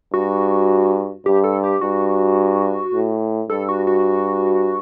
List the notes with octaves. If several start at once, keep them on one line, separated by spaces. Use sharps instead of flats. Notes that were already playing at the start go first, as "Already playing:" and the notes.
G2 F#4
G2 G4
A4
G4
G2 F#4
A2
G2 A4
F#4
F#4